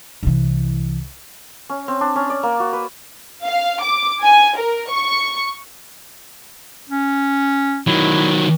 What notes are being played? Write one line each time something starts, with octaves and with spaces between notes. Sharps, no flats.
C2 E3
C#4
C4
D4
C#4
D5
A#3
F#4
B4
F5
D6
G#5
A#4
C#6
C#4
D#3 F#3 E4